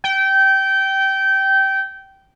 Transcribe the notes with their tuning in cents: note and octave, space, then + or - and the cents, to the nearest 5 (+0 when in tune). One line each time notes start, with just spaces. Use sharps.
G5 -20